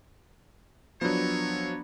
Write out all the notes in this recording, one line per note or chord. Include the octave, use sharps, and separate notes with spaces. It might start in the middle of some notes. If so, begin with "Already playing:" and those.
F3 F#3 B3 D4 C#5